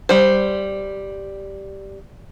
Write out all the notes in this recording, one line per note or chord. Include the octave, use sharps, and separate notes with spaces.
G3 C5